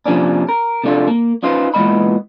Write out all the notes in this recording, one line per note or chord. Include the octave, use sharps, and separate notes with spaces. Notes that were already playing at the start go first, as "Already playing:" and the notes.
C3 F3 A#3 C#4 D4
A#4
C3 A3 D4 F4 A4
A#3
C#4 D#4 F4 B4 C5
A#2 E3 G#3 B3 D#5 B5